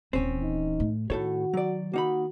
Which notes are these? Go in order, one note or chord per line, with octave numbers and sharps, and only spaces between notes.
D#1 E3 C4 C#4
D#4
A2
A2 D#3 F#4 A4 C#5
F#3 D5
A#3 D#4 F#4 B5